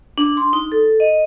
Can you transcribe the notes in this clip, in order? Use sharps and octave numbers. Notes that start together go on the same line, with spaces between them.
D4
C6
D#4
A4
D#5